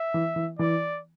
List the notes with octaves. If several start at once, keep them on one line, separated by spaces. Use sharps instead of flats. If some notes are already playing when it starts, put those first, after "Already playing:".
Already playing: E5
E3
E3
E3 D5